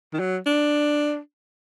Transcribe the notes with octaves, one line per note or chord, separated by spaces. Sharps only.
D#3
F#3
D4